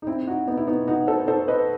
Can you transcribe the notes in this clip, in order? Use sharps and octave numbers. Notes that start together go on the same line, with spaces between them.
D#4
C4 E4
D#4 F#4
B3 D#4
E4
B3 D#4
D#4 F#4
A4 C5
A4 C5
B4 D#5